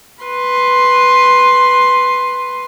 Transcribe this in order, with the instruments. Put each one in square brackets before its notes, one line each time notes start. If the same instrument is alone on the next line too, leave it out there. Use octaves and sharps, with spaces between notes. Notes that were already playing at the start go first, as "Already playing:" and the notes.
[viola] B4 C6